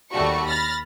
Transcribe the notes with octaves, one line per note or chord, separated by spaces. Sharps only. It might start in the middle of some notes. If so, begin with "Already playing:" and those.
D#2 G3 A3 F#4 C#6
B5 F6 A6 A#6